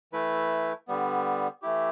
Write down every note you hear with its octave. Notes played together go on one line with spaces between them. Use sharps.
E3 A3 E4 B4
D3 G3 B3
E3 A3 E4 G4